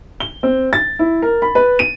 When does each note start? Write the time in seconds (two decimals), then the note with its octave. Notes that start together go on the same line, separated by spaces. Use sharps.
0.20 G7
0.43 C4
0.73 A6
0.99 E4
1.22 A#4
1.42 B5
1.55 B4
1.79 D#7